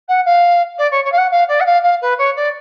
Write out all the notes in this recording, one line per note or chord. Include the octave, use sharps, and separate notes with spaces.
F#5
F5
D5
C#5
C#5
F5
F#5
F5
D5
F#5
F5
F5
B4
C#5
D5